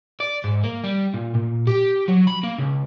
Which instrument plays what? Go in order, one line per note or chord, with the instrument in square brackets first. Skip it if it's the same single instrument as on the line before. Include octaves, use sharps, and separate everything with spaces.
[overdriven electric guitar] D5
G#2
A#3
G3
A#2
A#2
G4
F#3
B5
A#3
C#2